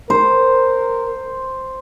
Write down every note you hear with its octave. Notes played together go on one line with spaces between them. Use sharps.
A#4 C5